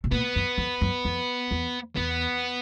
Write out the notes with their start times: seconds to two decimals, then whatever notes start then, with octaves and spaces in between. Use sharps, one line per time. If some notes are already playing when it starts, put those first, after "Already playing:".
0.04 B2
0.12 A#2 B3
0.36 F#2
0.58 F2
0.81 F#2
1.05 F2
1.51 E2
1.96 E2 B3